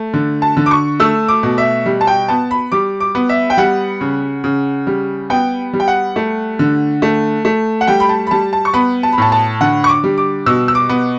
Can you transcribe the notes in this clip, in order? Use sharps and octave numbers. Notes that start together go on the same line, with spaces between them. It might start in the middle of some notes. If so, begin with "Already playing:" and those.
Already playing: A3
D3
A5
D3
D6
C#6
A3 E6
D6
B2
E5
G3
A5
G5
B3 A5
B5
G3 D6
D6
B3
E5
G5
G3 F#5
C#3
C#3
G3
B3 G5
G3
G5
F#5
A3
D3
A3
A3
F#5
G3 G5
B5
A5
B5
G3 A5
A5
C#6
B3 B5
A5
B5
A2 A5
A5
D3 F#5
C#6
D6
G3
D6
B2 E6
E6
D6
B3